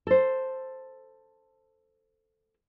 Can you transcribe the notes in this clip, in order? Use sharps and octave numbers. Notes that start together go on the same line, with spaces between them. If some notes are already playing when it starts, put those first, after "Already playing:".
A4 C5